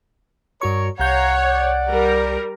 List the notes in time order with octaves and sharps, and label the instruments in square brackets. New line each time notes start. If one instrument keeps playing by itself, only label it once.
[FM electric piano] G2 F#4 C#6 [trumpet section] A#4 C#5
[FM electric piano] C2 G6 [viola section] C#5 [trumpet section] F5 A#5 [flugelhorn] F#5
[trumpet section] D5
[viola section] G3 A#4